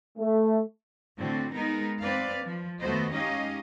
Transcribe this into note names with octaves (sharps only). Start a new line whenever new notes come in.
A3
A2 D3 C4 F#4
G#3 B3 D#4 A#4
C4 B4 D5 F5
F3
D#2 A3 B3 F#4 C5 D#5
G#3 C#4 D#4 G4 D#5 F5